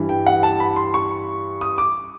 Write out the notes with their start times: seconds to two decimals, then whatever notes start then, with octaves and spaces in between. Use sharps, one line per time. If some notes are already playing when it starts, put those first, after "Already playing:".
Already playing: G2 E3 G3
0.09 G5
0.26 F#5
0.43 A5
0.60 B5
0.76 C6
0.94 C#6
1.61 D#6
1.78 D6